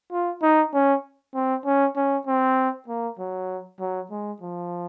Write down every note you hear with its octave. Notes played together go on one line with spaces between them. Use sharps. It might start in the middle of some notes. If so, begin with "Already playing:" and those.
F4
D#4
C#4
C4
C#4
C#4
C4
A#3
F#3
F#3
G#3
F3